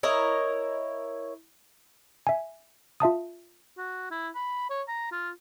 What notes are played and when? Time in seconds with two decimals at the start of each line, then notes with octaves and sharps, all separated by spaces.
0.03 E4 A#4 C#5 D#5
2.27 E5 G#5
3.00 F4 E5 A5 D#6
3.78 F#4
4.11 E4
4.35 B5
4.70 C#5
4.88 A#5
5.12 F4